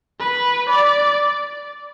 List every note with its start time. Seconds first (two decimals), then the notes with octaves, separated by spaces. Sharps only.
0.20 B4
0.70 D5